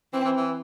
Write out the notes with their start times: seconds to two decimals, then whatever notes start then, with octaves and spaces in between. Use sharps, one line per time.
0.13 E3 C4
0.25 E3
0.37 E3